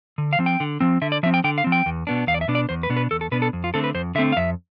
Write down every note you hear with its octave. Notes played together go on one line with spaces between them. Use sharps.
D3
F5
F3 C4
G5
D3
F3 C4
D3 E5
D5
F3 C4 E5
G5
D3 G5
F5
F3 C4
G5
E2
B2 B3 D4
E2 F5
D5
E5
B2 B3 D4
D5
E2 C5
B4
B2 B3 D4
B4
E2 A4
A4
B2 B3 D4 B4
A4
F2
F4
D3 A3 C4 A4
B4
F2 C5
D3 A3 C4 E5
F5
F2 E5